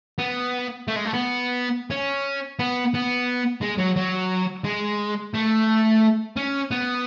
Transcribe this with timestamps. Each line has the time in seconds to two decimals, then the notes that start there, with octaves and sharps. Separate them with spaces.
0.19 B3
0.88 A3
0.96 G#3
1.05 A3
1.13 B3
1.91 C#4
2.59 B3
2.94 B3
3.62 G#3
3.79 F#3
3.97 F#3
4.65 G#3
5.34 A3
6.37 C#4
6.71 B3